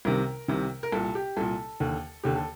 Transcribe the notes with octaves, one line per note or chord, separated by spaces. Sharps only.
C2 C3 D#3 A#4
C2 C3 D#3
A#4
C2 A#2 A4
G4
C2 A#2 A4
D#2 D3
D#2 D3 G4
A4